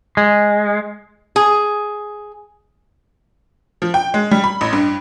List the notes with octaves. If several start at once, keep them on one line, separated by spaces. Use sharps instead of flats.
G#3
G#4
F3
G5
G#3
G3
B5
A1
G2